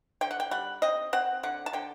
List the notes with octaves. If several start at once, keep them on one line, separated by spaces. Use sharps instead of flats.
D3 G5
F#5
G5
G3 F#5
C4 D#5
C4 F#5
D3 F#5
A5
D3 G5